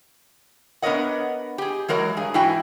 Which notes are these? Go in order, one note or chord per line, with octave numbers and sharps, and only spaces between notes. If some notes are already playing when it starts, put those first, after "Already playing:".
B3 D4 A#4 C#5 D#5 F#5
G4 G#4
E3 F#3 G#3 A#4 C#5
G2 G#4
G#2 E3 E4 F#4 G5 G#5